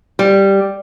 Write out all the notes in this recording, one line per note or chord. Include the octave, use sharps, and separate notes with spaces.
G3